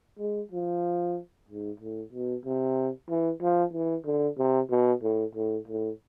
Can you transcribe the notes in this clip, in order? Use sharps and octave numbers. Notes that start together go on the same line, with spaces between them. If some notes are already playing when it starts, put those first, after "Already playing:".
G#3
F3
G#2
A2
B2
C3
E3
F3
E3
D3
C3
B2
A2
A2
A2